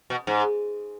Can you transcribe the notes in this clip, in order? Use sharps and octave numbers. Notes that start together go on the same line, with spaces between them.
B2
G#2